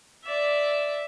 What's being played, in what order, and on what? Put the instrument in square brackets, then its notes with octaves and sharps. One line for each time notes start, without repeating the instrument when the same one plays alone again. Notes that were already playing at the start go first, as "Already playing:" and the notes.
[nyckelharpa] D5 E5